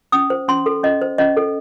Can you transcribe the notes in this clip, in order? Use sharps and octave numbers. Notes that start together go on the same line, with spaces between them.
C#4 D#6
C5
C#4 C6
A4
C#4 D#5
C5
C#4 D#5
A4